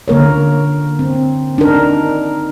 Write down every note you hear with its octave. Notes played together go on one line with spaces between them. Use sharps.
D3 A#3 A#4 C#5
C4
D4 D#4 A#4